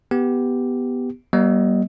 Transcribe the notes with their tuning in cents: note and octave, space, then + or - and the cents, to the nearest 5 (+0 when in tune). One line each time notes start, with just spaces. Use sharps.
B3 +0 G4 +0
G3 -35 A#3 +45 D#5 +5